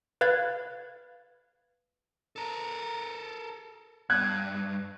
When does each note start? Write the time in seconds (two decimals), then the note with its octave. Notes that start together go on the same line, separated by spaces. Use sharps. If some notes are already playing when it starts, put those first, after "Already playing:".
0.21 B4 F5 F#6 G#6 A6
2.36 A4 A#4
4.10 G2 F#6 G#6